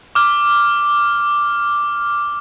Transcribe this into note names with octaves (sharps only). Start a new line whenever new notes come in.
D6 F6